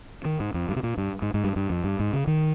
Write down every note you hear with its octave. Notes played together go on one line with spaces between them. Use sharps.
D#3
G#2
F2
G2
C3
A#2
G2
G#2
G#2
G2
G2
F2
G2
G#2
C#3
D#3